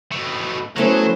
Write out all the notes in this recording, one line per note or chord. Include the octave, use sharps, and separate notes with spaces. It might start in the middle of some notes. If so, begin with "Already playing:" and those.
B2 A3
F#3 A3 B3 C#4 E4 C5